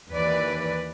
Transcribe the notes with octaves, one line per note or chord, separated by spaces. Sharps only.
D#2 E3 B4 D5